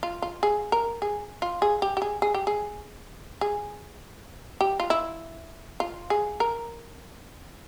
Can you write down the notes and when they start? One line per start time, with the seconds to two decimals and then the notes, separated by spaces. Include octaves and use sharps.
0.03 F4
0.22 F4
0.43 G#4
0.72 A#4
1.02 G#4
1.42 F4
1.62 G#4
1.82 G4
1.97 G4
2.02 G#4
2.22 G#4
2.34 G4
2.47 G#4
3.41 G#4
4.61 G4
4.80 F4
4.90 E4
5.80 F4
6.10 G#4
6.40 A#4